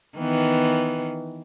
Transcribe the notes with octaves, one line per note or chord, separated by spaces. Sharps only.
D#3 E3 B3